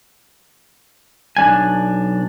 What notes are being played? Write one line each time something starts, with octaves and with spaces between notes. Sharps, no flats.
B1 D4 G#5